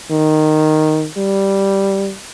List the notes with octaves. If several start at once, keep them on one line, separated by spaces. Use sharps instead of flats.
D#3
G3